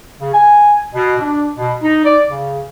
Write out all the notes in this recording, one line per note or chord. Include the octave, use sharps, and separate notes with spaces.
C#3
G#5
B2
D4
B2
D#4
D5
C#3